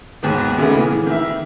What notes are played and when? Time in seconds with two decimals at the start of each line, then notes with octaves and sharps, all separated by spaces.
0.23 D#2 G#2 D#3 B3
0.58 A#2 C#3 A3 B3
0.77 E3
1.06 D#3 E5